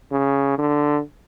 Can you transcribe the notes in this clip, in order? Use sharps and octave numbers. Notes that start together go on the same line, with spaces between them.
C#3
D3